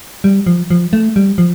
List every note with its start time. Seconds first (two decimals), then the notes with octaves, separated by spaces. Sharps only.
0.24 G3
0.47 F3
0.71 F3
0.93 A3
1.16 G3
1.38 F3